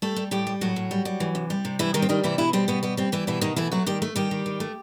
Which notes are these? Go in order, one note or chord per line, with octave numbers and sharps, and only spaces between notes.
G3 A3 A4
G3
A2 G3 G4
G3
A2 F#3 F#4
A2
G3
G3
E3
C3
G3
C3
E3 G3 E4
D#3 G3 D#4
C4
D#3 G3 D#4
C3 E3 E4
B2 E3 E4
G3 C4
B2 B3
G3 B3
G3 C4
E3 G3 E4
B2 E3 E4
B2 D#3 D#4
E3 A3 E4
F#3 A3 F#4
D#3 G3 G4
A3
D#3 G3 G4
D#3
D#3
A3